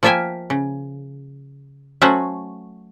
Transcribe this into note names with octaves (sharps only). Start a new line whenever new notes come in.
F3 A#3 F4 E5 G5 G#5
C#3
F#3 A3 C#4 F#4 C5